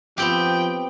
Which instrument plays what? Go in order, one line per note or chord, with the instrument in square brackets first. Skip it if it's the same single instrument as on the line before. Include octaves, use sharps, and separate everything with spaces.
[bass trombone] F3 [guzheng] B3 C4 G4 [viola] G5